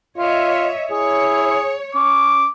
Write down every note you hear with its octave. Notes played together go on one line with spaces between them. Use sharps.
F4 C#5 D#5 E5
E4 G#4 C#5
C#4 D6